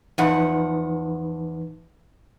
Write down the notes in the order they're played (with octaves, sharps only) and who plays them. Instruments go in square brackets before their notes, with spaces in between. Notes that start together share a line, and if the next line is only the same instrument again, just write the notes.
[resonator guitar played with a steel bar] E2 F3 F#5 [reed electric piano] E3 D#4 B4